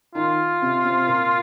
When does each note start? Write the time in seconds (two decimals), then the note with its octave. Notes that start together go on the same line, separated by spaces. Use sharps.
0.15 D#3 D#4 F4
0.62 C3 C4
0.85 C3 C4
1.07 A#2 A#3